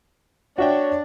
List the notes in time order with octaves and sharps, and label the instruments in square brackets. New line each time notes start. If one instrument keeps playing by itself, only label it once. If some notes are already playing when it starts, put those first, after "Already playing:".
[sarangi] D4 [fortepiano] F#4 E5 G5 [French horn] C#5